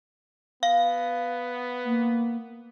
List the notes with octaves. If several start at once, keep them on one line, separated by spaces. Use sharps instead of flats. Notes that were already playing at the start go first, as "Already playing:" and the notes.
B3 F5
A#3